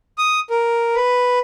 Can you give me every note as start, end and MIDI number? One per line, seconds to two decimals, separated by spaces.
0.18 0.40 87
0.50 0.95 70
0.95 1.39 71